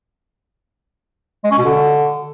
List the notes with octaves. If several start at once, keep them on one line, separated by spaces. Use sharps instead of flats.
G#3
C#4
B2
D3